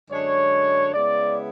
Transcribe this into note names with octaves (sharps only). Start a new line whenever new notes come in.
F#2 D3 G#3 D4 C#5
C#3 G#3 B3 E4 D5